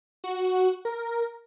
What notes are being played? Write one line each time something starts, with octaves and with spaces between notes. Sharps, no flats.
F#4
A#4